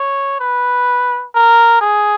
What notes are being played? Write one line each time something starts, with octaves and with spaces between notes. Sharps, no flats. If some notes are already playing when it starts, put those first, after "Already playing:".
Already playing: C#5
B4
A#4
G#4